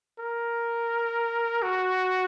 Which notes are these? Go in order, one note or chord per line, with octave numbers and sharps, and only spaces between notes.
A#4
F#4